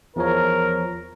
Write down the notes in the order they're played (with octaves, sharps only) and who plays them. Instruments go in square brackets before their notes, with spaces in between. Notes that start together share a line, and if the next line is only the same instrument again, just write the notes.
[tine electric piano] E2 F3 C#5 [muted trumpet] A#4